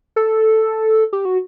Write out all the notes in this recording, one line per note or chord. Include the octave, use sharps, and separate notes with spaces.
A4
G4
F#4